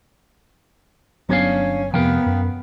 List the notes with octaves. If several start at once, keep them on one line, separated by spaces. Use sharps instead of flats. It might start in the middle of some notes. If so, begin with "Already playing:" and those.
G1 F#3 B3 C#4 D4 C#5 F5
F2 C3 F3 B3 A#4 F5 G5
F#2